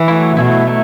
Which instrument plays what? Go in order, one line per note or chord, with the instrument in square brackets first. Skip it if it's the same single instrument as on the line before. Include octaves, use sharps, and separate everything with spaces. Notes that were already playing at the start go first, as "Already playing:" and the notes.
Already playing: [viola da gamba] E3
[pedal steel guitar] F#3 A3 E4
[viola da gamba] B2 [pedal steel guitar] F#3 A3 E4
[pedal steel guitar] F#3 A3 E4